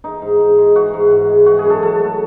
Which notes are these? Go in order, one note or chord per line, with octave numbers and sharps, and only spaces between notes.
E3 D#4
G#2
G#2
G#3
E3 F#4
G#2
G#2
G#3
E3 F#4
G#4
F#2
A4
F#2 A4
A3